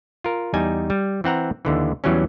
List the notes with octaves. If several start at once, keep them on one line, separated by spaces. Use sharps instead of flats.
F4 A#4
E2 G3 D#4 G#5
G3
E3 C4 F#5 A#5
D#2 D3 E3
E2 E3 F#3 G3 C#4